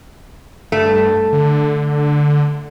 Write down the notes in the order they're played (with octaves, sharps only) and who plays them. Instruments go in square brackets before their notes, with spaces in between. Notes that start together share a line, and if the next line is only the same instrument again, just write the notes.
[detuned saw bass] G2 [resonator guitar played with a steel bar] A3
[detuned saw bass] D3